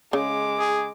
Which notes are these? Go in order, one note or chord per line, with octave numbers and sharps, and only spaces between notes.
C#3 G#3 D6
G#4